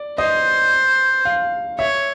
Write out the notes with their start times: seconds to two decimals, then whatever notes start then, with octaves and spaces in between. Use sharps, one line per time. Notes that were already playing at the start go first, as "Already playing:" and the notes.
Already playing: D5
0.18 C5 D#5
1.25 F5
1.79 C#5 E5